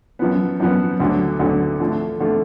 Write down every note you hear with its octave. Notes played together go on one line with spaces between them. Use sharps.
F#2 F3 B3
F#2 F3 B3
D2 D3 F#3
D2 D3 F#3
D3 F3 A3 F4
D3 F3 A3 F4